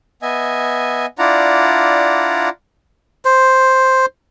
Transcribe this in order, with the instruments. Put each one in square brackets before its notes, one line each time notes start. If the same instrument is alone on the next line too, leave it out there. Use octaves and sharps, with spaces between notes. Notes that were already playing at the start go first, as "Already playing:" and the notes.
[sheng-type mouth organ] B3 D#5 E5 G#5
D4 E4 F4 D5 F#5 A#5
[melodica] C5